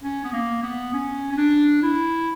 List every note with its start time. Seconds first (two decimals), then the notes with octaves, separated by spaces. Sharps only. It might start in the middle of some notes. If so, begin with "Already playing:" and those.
0.03 C#4
0.24 B3
0.33 A#3
0.63 B3
0.93 C#4
1.32 C#4
1.37 D4
1.82 E4